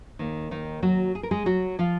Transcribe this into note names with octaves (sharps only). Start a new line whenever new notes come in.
D#2 D#3 A#3
D#3 D#4
F#3 F#4
G#4
A#4
G#3 G#4
F#3 F#4
F3 F4